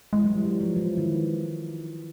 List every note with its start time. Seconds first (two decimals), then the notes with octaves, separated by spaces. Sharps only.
0.13 E3 G#3
0.25 F#3
0.35 G3
0.45 F#3
0.61 F3
0.76 E3
0.97 D#3